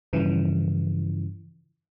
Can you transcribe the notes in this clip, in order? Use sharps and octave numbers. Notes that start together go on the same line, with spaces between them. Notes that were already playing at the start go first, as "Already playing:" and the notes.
G2 C#3 E3 F3